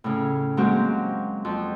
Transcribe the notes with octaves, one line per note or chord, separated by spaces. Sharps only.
A2 C#3
F#3 G#3 A#3 C4 F#4 G4
F2